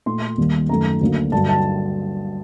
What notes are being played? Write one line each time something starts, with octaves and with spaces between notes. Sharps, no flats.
A#2 A3 C6
D#2 D#3 G3 A#3
F#2 D#3 A3 A#5
D2 D3 F#3 A#3
G2 D3 F#3 A5
A5